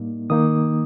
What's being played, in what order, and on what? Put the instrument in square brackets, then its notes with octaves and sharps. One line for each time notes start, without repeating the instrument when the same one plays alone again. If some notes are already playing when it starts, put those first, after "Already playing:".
Already playing: [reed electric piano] A2 G3 A#3 D#4
D#3 A#3 D#4 D#6